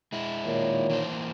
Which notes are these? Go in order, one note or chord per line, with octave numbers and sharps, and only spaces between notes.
G#3 E4
A#2 D#3 C#5
E3 A#3 C5